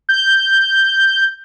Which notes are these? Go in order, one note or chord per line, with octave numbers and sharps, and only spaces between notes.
G6